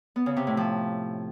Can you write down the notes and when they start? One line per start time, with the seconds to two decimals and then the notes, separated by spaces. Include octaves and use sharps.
0.16 B3
0.26 C#3
0.37 C3
0.47 A2
0.57 F3